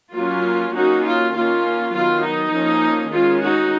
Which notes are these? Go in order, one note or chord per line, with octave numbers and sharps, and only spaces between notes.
F#3 A#3 C#4 F4
F#3 A#3 C#4 D#4 F#4
F4
D#3 A#3 C#4 F4
D#3 F#3 B3 F4
D#4
F3 A#3 C#4
D#3 G#3 C#4 F4
D#4 F#4